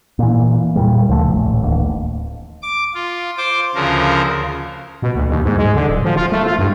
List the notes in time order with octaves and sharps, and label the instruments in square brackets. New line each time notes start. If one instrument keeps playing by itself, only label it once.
[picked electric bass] A#2 E3
E2 A#2 G3
D2 C#3 F3 A3
D#1 A1 A3
D1 D#2
[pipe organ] D6
F4
C5 D6
D2 C#3 F3 A#4
[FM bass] B2
D2
D#2
G#2
G#3
D3
D1
F3
F4
A3
F4
G2